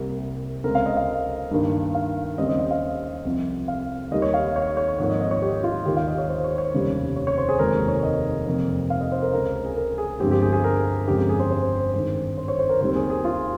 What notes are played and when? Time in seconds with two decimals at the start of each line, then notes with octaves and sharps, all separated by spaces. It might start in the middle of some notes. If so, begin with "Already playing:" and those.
Already playing: C2 C3 G3 A#3 A#4
0.64 C#2 C#3 G#3 C4 A#4
0.75 F5
0.86 D#5
0.97 F5
1.51 G2 D#3 A#3
1.95 F5
2.38 D#2 C#3 G3 C4 D#5
2.49 D#5
2.60 D#5
2.71 F5
3.25 C2 C3 F3 C4
3.68 F5
4.11 D#2 D#3 G3 D#5
4.22 C#5
4.34 F5
4.56 C#5
4.77 C#5
4.99 G#1 G#2 F3 A#3 C#5
5.09 D#5
5.21 D#5
5.31 C#5
5.42 G4
5.64 F4
5.85 D#2 D#3 A#3 G4
5.97 F5
6.07 D#5
6.18 C#5
6.29 C5
6.44 C#5
6.58 C#5
6.73 F1 D#2 C#3 G3
7.16 C#5
7.27 C#5
7.38 C5
7.49 G#4
7.59 F1 D#2 D#3 G#3 A#4
7.88 C#5
8.03 D#5
8.46 F1 F2 D#3 A#3
8.90 F5
9.01 D#5
9.12 C5
9.22 A#4
9.33 C#2 C#3 G#3 A#4
9.65 G#4
9.76 A#4
9.98 G#4
10.20 G1 G2 F3 G#3 C4 G4
10.31 G4
10.42 G#4
10.53 G#4
10.64 A#4
11.07 G1 F2 C#3 G#3 G4
11.18 G4
11.29 G#4
11.40 C5
11.51 C5
11.93 G#1 G2 D#3
12.38 C5
12.48 C#5
12.59 C5
12.69 A#4
12.81 D#2 D#3 G3 C4 C5
12.95 G#4
13.10 G#4
13.25 F4